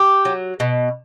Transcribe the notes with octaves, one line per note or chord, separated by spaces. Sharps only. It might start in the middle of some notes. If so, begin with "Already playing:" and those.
Already playing: G4
F#3
B2